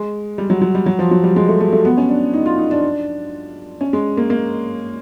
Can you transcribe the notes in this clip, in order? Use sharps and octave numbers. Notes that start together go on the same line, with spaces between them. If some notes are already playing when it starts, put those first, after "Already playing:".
Already playing: G#3
G3
F#3
F#3
G3
F#3
F3
F#3
G3
G#3
A3
A3
A3
B3
C#4
D4
D#4
F4
D#4
D4
C#4
G#3
A#3
A#3